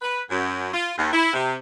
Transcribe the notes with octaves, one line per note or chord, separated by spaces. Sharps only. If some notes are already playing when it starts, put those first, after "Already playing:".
B4
F#2
F4
D#2
E4
C3